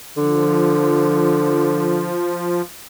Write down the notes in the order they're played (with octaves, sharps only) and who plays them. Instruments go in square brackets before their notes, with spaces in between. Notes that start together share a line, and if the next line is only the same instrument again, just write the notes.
[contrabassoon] D3 [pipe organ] F3